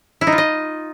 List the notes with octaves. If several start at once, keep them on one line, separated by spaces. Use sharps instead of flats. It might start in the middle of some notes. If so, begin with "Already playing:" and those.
E4
D#4
F4
D#5